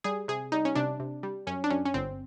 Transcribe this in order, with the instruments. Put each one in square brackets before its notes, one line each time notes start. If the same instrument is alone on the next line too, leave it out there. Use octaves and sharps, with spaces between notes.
[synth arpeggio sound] G3 G#4
C3 G#4
G3 D#4
C#4
C3 D4
C3
G3
F#2 C#4
D4
F#2 C#4
C#4
G1 C4